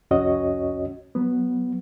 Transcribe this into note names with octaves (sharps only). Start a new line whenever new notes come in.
C2 F2 C#4 F#4 C#5 D#5
F#3 B3